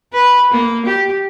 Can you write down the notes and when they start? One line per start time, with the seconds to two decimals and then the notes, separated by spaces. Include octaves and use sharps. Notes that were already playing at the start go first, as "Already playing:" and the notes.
0.13 B4
0.51 A#3
0.86 G4